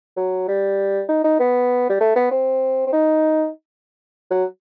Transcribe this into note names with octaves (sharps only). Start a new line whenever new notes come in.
F#3
G3
D#4
D#4
B3
G3
A3
B3
C4
C4
D#4
F#3